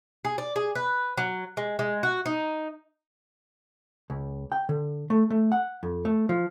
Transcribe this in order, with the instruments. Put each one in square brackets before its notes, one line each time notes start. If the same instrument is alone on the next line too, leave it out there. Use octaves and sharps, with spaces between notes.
[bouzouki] G#4
D5
G#4
B4
F#3
G#3
G#3
F#4
D#4
[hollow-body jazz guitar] C#2
G5
D3
A3
A3
F#5
F2
A3
F3